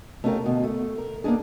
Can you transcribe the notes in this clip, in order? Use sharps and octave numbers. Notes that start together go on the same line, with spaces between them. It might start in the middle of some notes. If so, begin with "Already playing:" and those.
A3 B3 C#4 F4 G4 A#4
D2 B2
A3
A#4
A#3 B3 C#4 D4 G#4